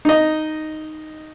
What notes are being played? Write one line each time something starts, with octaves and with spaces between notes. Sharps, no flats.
D#4 D#5